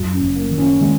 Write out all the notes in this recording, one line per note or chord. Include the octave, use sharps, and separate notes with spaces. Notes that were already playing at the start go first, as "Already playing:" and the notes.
Already playing: F#2 F#4
C#4
F#1
A#3
D#3
C#4
D#3 G#3